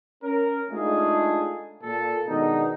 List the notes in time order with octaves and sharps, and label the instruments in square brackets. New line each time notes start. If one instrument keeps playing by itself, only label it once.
[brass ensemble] C#4 A#4
G#3 A3 D4 D#4 F4 G#4
A#2 A4
B2 D#3 G#3 B3 D4 D#4